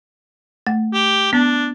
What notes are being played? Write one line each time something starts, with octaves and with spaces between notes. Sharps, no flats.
A3 F#5
G4
B3 D4